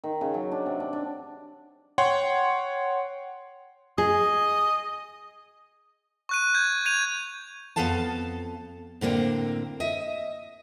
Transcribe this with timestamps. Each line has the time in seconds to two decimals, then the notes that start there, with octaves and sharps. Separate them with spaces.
0.04 D#3
0.21 C#3
0.34 F#3
0.52 D4
0.66 C3
0.80 D4
0.93 D4
1.98 C#5 F#5 G5 C6
3.98 G#4 D#5
6.29 C#6 F#6 D#7
6.54 G6 G#6
6.85 G#6 D#7 F7
7.76 F2 F3 B3 A4 F5 A5
9.01 A2 D3 A#3 C4
9.80 D#5 E5